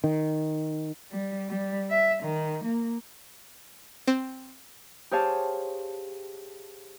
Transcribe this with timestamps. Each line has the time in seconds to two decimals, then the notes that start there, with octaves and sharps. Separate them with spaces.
0.04 D#3
1.11 G3
1.49 G3
1.90 E5
2.23 D#3
2.64 A#3
4.08 C4
5.11 G4 G#4 C5 C#5 F5 A5